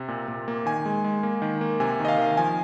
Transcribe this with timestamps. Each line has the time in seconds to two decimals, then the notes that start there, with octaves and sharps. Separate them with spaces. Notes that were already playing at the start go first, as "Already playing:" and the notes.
Already playing: C3
0.08 A#2
0.28 A#2
0.48 A#3
0.66 D#3 G#5
0.86 G#3
1.04 G#3
1.23 A#3
1.42 D#3
1.61 A#3
1.80 C3 G#5
2.00 D#3 D#5
2.08 F5
2.18 D#3
2.37 F3 G#5